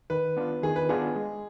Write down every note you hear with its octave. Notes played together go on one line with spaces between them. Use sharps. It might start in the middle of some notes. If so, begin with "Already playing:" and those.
D#3 B4
B3 D4 F4
D#3 G#4
B4
B3 D4 F4 G#4
G#3